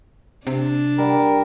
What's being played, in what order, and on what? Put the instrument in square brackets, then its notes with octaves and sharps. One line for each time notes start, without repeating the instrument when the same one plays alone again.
[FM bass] C3 [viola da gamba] D4
[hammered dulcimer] G3 [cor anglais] A#4